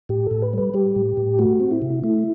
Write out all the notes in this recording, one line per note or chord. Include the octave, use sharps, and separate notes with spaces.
A2 G4
A2 A4
B4
G3 B4
G3 G4
A2
A2
A3 F#4
C4
E4
C3
A3 E4